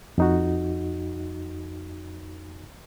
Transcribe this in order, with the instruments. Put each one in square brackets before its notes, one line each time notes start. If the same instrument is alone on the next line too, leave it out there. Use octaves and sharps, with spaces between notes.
[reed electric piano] F2 D#4 F#4